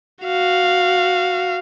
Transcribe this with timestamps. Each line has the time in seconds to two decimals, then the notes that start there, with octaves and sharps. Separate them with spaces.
0.24 F#4 F5